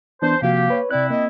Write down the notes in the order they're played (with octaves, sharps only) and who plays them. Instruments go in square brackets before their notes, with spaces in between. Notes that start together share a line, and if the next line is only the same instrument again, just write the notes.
[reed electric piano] E3 B3 D4 [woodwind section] C5 [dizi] A5
[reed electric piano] C3 F3 F#4 [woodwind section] A#3 G4 [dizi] F5
[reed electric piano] B4 C#5
[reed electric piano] C3 F#6 [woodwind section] C4 E4 [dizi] D5
[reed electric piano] A#3 [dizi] D#5